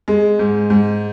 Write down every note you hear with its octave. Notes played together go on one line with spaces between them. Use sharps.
G#3
G#2
G#2